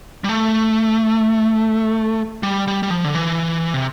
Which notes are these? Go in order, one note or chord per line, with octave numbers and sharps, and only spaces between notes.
G3
A3
G3
G3
G3
F3
D3
E3
C3